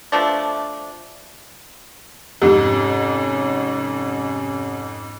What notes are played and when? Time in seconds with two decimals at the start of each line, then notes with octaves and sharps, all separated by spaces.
0.12 F3 A3 D4
2.42 F2 G#2 C3 C#4 G4